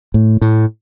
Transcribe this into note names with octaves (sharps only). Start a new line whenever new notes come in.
A2
A2